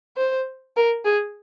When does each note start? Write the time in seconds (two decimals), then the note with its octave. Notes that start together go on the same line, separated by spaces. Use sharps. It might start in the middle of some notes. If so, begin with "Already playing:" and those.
0.17 C5
0.76 A#4
1.05 G#4